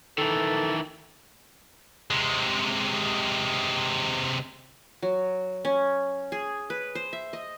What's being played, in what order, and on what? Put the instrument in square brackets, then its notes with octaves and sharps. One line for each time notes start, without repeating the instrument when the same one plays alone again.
[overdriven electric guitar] D#3 E3 [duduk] A4
[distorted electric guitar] C3 G#3
[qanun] F#3
C#4
G#4
B4
C5
E5
D#5